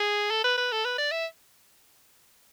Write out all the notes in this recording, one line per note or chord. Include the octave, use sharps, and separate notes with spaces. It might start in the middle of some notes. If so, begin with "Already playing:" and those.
Already playing: G#4
A4
B4
B4
A4
B4
D5
E5